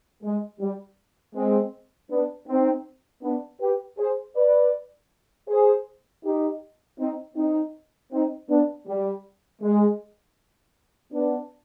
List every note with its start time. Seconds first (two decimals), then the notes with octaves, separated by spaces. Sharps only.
0.23 G#3
0.60 G3
1.35 G#3 C4
2.10 B3 D4
2.48 C4 D#4
3.23 B3 D4
3.61 G4 B4
3.98 G#4 C5
4.36 B4 D5
5.49 G#4 C5
6.24 D#4 G4
6.99 C4 D#4
7.36 C4 D#4
8.12 C4 D#4
8.49 B3 D4
8.87 G3
9.62 G#3
11.12 B3 D4